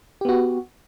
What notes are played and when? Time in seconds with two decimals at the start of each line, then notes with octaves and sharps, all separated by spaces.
0.21 G4
0.25 B3
0.29 F#4